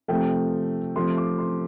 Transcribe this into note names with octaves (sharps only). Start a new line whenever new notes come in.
C3 F3 A3 G5
C3 F3 A3 C6
D6
C6